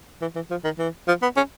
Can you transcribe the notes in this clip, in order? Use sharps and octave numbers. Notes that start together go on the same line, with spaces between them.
E3
E3
F3
D#3
E3
F3
B3
C#4